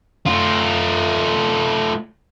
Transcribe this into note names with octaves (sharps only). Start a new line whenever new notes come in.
A3 F4